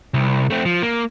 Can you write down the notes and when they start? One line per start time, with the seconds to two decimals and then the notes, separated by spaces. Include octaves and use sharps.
0.14 C2
0.50 A3 C4
0.65 F3
0.82 A#3